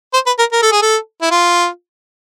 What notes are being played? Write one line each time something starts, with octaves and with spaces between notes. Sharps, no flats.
C5
B4
A#4
A#4
A4
G#4
A4
E4
F4